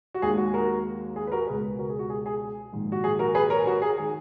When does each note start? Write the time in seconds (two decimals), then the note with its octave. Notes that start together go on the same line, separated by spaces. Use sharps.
0.14 F#4
0.22 D#2 D#3 G#3 G#4
0.37 F#4
0.54 F#4 A#4
1.16 G#4
1.27 B4
1.32 F#4 A#4
1.47 C#2 B2 G#3 G#4 B4
1.79 F#4 A#4
1.89 G#4
1.99 F#4
2.10 G#4
2.26 G#4
2.72 A#1 G#2 D#3
2.92 F#4
3.04 G#4
3.19 F#4 A#4
3.35 G#4 B4
3.50 A#4 C#5
3.66 F#4 A#4
3.82 G#4
3.97 D#3 G#4